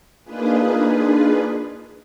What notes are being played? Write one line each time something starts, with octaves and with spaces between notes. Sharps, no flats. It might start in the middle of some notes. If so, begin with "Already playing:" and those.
A#3 D4 D#4 F4 G#4 B4